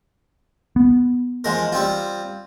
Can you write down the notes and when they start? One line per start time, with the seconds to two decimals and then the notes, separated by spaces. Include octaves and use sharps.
0.76 B3
1.44 F3 G#3 A#4
1.72 G3 C4 F4